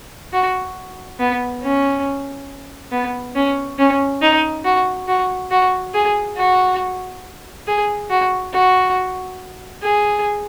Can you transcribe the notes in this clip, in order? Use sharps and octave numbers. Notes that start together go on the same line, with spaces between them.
F#4
B3
C#4
B3
C#4
C#4
D#4
F#4
F#4
F#4
G#4
F#4
G#4
F#4
F#4
G#4